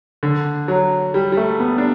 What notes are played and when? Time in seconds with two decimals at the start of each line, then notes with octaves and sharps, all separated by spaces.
0.23 D3
0.68 F#3
1.14 G3
1.32 G3
1.37 A3
1.60 B3
1.78 D4